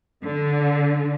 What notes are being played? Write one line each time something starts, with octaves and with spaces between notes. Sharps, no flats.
D3